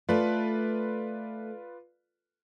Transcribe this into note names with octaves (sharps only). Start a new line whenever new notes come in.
A3 F4 A4 B4 D5